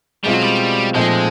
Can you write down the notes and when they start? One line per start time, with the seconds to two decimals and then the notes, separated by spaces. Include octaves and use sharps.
0.24 B2 G3 G#3 C4 F4
0.34 F#3
0.43 G3
0.94 A#2 F3 G#3 A3 C4 D#4